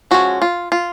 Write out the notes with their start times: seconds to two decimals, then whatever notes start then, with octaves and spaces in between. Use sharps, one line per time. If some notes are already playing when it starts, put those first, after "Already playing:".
0.11 F3 G#3 C#4 F#4
0.42 F4
0.72 F4